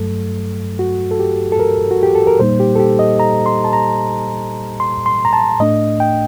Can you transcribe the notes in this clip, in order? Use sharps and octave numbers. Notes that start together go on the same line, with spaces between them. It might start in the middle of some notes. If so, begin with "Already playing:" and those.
Already playing: G2 F#3 A3 A4
F#4
A4
G4
A4
A#4
F#4
G4
A4
A#4
A#2 G3 A#3 D#4 C5
G4
A4
G4
D#5
A#5
C6
A5
A#5
C6
C6
A#5
A5
A2 A3 D4 D#5
G5